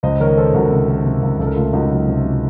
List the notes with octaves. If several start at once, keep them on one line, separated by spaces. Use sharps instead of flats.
C#2 C5 D#5
D#3 A#4 C#5
D#3 A4 C5
C#2 F#4 A#4
C3
D#3
C3
C#2
C#2 A4
A#4
A3 F4 A4
C#2 D#4 F#4
F#3
C3
C3